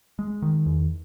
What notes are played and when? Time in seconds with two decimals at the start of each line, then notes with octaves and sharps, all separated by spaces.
0.19 G#3
0.42 D#3
0.66 E2